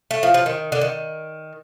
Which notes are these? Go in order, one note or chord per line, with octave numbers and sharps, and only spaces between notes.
A3
F3
F3
D#3
D3
D#3